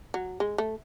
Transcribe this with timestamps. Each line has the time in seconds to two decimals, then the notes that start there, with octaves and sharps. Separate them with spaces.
0.14 F#3
0.40 G#3
0.58 A3